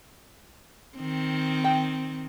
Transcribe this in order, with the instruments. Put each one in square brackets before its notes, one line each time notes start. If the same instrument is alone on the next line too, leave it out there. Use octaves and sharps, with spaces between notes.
[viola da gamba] D#3 C4
[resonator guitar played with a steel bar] G5